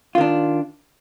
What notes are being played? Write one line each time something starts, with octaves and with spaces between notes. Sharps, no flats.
D#3 D4 F4